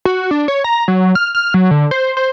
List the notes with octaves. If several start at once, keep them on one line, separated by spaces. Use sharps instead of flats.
F#4
D4
C#5
A#5
F#3
F6
F6
F#3
D3
C5
C5